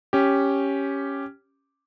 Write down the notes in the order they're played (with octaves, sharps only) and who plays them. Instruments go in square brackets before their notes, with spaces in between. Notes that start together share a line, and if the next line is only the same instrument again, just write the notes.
[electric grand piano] C#4 G4